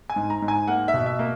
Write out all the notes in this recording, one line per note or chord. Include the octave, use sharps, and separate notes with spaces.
G#5
G#2
A#5
G#2
G#5
A#3 F#5
E5
B2
E5
A#3